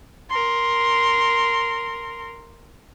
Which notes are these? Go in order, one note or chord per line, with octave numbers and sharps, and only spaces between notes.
A#4 C6